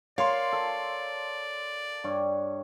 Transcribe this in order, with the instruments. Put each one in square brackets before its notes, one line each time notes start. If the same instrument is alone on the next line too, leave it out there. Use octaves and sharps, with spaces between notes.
[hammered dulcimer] A#4 [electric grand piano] C#5 C6 [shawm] D5 [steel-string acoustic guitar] F5
[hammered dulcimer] A4
G2 C#5